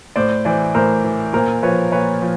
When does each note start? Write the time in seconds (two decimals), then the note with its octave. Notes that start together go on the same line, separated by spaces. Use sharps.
0.16 A2 C5 D5
0.45 E3 C5 D5
0.75 A2 A#4 C5
1.04 E3
1.33 A#2 A#4 C5
1.63 F3 B4 C#5
1.92 A#2 B4 C#5
2.21 F3